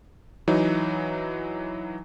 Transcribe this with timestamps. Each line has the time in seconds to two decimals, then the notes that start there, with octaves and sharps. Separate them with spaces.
0.48 E3 F#3 D#4